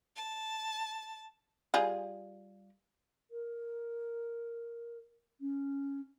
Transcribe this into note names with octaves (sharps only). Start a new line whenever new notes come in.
A5
G3 F4 G#4
A#4
C#4